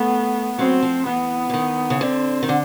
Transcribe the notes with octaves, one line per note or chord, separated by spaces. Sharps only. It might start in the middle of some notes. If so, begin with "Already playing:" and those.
Already playing: A3 B3
F#3 C4
F3
E3 B3
E3
D#3
C#3
D3 C4
D#3
D3